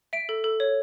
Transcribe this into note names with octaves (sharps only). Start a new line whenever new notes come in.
E5 D7
A4
A4
C#5